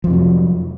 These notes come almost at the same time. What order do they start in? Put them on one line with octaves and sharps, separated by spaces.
F3 F2 C3 F#3